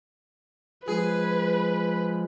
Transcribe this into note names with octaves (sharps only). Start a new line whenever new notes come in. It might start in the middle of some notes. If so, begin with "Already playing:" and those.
F3 G#3 G#4 B4